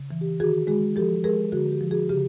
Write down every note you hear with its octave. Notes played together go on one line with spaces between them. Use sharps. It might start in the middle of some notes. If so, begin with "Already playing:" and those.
Already playing: C#3
E3
G4
D#3 F#4 G#4
G#3 F#4 G#4
F3 G4 A4
G#3 G#4 A#4
D3 F#4 G#4
G4
F3
F#4 G#4
C#3 G4